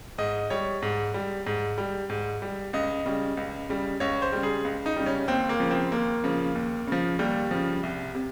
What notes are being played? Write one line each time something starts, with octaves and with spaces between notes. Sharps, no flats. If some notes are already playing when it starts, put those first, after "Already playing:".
G#2 D#5
G3 C#5
G#2
G3
G#2
G3
G#2
G3
C#2 D#5
C#3 G3
C#2
C#3 G3
C#2 C#5
C5
C#3 G3
G#4
C#2
D#4
C#3 G3
C#4
D#2 C4
A#3
C#3 F3
C4
D#2 A#3
C#3 F3
D#2
C#3 F3
D#2 G3
C#3 F3
C2
C3